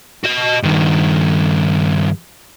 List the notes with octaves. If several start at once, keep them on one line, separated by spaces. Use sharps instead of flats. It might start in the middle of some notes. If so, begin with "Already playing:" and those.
F#4 D#5
G2 D#3